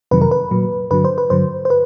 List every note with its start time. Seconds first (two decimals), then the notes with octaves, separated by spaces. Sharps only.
0.11 F2 C3 D#3 F#3 B4
0.21 A#4
0.31 B4
0.51 A#2 F#3
0.91 G2 D3 F#3 B4
1.05 C5
1.18 B4
1.30 G2 D3 F#3 C5
1.65 C5
1.70 B4